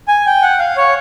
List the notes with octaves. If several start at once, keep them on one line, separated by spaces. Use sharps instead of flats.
G#5
G5
F#5
F5
C#5